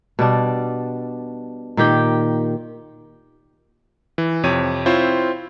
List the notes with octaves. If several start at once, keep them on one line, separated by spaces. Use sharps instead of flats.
B2 G3 D4
A#2 D#3 G4 G5
E3
F2 C3 C#5 D#7
C4 E4 F4 C5 C#5